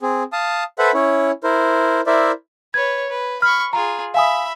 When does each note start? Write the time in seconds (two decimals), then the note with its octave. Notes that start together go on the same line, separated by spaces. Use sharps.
0.02 C4 G#4
0.33 F5 A5 D#6
0.79 A4 B4 C5 E5 F#5 B5
0.94 C#4 E4 C#5
1.43 E4 A#4 C5
2.07 E4 A#4 C5 D5 E5
2.74 B4 C#5 G#6
3.10 B4
3.42 B5 C#6 F6
3.73 F4 G#4 A#5
4.14 E5 F5 G#5 B5 D#6